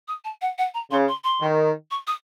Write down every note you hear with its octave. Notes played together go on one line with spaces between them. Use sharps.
D#6
A5
F#5
F#5
A#5
C#3 C6
C6
C6
D#3
C#6
D#6